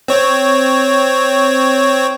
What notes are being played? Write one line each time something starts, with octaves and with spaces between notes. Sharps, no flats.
C4 C#5